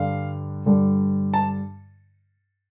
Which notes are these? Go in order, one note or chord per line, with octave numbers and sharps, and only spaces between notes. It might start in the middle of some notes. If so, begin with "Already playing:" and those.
Already playing: G2 D3 G3 F5
G2 D3 G3
A5